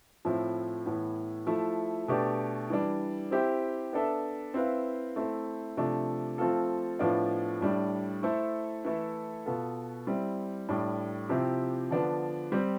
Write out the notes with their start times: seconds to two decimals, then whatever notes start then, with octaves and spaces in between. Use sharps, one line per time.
0.25 A2 F3 C4 E4
0.86 A2 E3 B3
1.47 F3 A3 E4
2.08 B2 A3 D4 G4 D5
2.70 E3 G3 D4
3.31 C4 E4 G4 C5
3.93 B3 D4 A4 E5
4.54 C4 E4 B4 F5
5.16 A3 C4 E4
5.77 C3 F3 A3 D4
6.38 F3 A3 C4 F4 A4
6.99 A2 F3 B3 D4 F4
7.61 A2 G3 D4
8.23 A3 E4 A4 C5
8.85 E3 A3 E4 A4
9.46 B2 B3 F4 A4
10.07 G3 C4 E4
10.69 A2 G3 D4
11.29 C3 F3 C4 E4 G4
11.91 D3 F3 B3 D4
12.52 G3 C4 G4